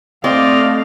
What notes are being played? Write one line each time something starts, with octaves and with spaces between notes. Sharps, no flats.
A3 C4 D5 D#5 F5